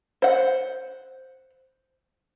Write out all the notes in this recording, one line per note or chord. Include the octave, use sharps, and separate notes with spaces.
C5 F#5